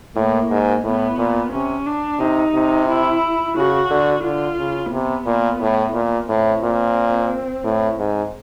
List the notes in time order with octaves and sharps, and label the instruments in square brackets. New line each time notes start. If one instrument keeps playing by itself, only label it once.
[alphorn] A2 [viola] A#3
[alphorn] G#2
[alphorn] A2 [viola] B3
[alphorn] A#2
[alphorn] C3 [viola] C#4
[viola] D4
[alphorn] C3 [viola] D#4
[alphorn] C3
[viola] E4
[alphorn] C#3 [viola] F#4
[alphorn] D3
[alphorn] D3 [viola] F4
[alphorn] C#3
[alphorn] C3 [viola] B3
[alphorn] A#2
A2
A#2
[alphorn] A2 [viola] C4
[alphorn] A#2
A2
G#2